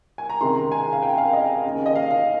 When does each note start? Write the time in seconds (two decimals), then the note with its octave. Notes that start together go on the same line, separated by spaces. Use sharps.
0.18 G#5
0.29 A#5
0.41 C#2 C3 D#3 C6
0.56 A#5
0.72 G#5
0.93 F5
1.02 G5
1.18 F5
1.33 D#5
1.64 D#2 C#3
1.86 D#5
1.95 F5
2.11 F5